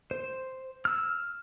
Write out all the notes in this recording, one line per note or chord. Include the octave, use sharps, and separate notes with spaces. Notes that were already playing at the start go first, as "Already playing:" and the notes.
C5
E6 F6